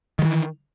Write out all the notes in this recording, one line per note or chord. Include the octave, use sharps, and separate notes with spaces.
D#3 E3 F#3